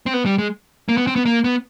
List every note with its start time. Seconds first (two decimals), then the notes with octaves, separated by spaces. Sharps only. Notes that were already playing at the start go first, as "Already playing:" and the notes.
0.06 C4
0.14 B3
0.26 G3
0.38 G#3
0.89 A#3
0.97 B3
1.07 C4
1.16 B3
1.26 A#3
1.44 B3